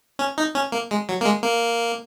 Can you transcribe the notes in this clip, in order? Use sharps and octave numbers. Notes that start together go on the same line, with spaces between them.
C#4
D#4
C#4
A#3
G#3
F#3
A#3
G#3
A#3